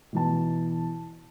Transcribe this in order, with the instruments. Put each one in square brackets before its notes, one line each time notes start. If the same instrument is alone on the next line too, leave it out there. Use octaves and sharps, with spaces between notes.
[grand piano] B2 E3 A5